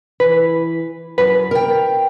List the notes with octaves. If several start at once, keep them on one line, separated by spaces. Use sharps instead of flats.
E3 B4
F#2 B4
A#4 G5